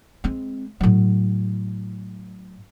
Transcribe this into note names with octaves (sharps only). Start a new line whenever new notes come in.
G#3 C4
A2 F#3